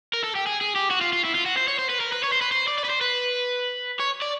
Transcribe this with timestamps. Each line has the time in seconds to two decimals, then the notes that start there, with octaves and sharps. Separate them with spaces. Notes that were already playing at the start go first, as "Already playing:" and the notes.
0.14 A#4
0.24 A4
0.35 G4
0.46 G#4
0.61 G#4
0.75 G4
0.91 F#4
1.01 F4
1.13 F4
1.24 E4
1.35 F4
1.46 F#4
1.57 C5
1.68 C#5
1.79 C5
1.90 B4
2.01 A#4
2.13 B4
2.24 C#5
2.33 C5
2.42 B4
2.52 C5
2.67 D5
2.78 D5
2.84 B4
2.89 C5
3.01 B4
4.00 C#5
4.22 D5